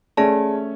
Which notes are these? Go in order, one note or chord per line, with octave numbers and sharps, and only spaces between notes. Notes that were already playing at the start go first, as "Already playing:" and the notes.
A3 C#4 G#4 D5 A5